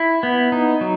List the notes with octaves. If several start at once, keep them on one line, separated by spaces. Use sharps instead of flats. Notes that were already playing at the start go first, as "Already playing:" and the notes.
Already playing: E4
B3
D#4
F#3